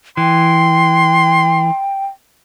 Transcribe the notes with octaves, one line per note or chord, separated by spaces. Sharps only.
E3 G5 C6